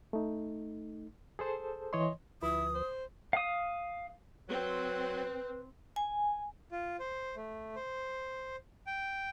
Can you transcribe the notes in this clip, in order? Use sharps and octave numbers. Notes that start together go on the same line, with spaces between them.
A3 D#4
G#4 A4 C5 A5
E3 C#5 D#5 C6
D2 F3 E4 B4 D#6
C5
F5 D#6
F#3 C4 B4
G#5
F4
C5
A3
C5
G5